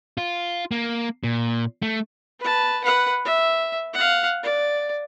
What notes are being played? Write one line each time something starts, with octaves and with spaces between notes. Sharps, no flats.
F4
A#3
A#2
A3
B4 A5
B4 F#5
E5
F5 F#5
D5